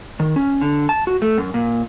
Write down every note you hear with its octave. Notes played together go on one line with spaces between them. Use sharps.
D#3
C#4
D3
A5
F#4
A3
F#2
A#2